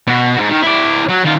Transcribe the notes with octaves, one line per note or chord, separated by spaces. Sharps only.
B2 F#4
G#2
D#3
E4 D5
F#3
D#3 F4